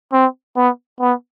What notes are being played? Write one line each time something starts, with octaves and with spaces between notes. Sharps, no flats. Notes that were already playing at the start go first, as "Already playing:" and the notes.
C4
B3
B3